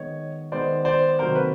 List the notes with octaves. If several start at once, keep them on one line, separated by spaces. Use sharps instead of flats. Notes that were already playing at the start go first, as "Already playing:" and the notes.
Already playing: D#3 G#3 B3 C#5 D#5
D#3 G#3 B3 C5 D5
C5 D5
C3 D#3 F#3 A#3 A#4 C5
B4